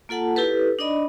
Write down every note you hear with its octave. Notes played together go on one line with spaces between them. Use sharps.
A#3 F4 A4 F#5 A5
E4 G4 A4 B4
D4 D#4 D5 D#5 B5